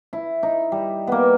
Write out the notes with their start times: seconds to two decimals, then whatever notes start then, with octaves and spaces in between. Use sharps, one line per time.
0.13 E4
0.43 D#4
0.72 G3
1.07 A#3 B3